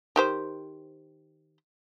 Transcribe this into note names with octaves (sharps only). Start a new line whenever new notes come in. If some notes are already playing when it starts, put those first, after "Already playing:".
D#3 G4 C5